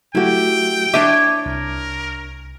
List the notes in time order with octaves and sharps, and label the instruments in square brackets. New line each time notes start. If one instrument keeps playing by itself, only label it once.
[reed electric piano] F#3 A3 F#4 [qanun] E4 G4 [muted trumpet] G5
[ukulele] D4 E5 [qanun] C#5 G#5 [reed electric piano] D6
[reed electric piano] C2 [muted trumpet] A#4